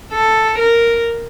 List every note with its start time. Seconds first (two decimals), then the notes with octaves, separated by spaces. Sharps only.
0.13 A4
0.59 A#4